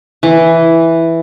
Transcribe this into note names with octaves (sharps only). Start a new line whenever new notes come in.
E3